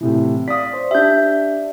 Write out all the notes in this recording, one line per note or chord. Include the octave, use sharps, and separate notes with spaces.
A2 C3 E3
D5 F5 D#6 B6
C5
D4 G4 E5 G6